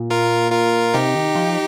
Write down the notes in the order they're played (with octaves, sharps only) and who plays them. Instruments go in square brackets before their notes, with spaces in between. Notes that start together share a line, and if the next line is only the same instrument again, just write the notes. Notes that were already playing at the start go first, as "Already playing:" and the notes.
Already playing: [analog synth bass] A#2
[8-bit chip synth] F4 A#4
F4 A#4
[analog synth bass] C3 [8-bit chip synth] D#4 G4
[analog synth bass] D#3
F3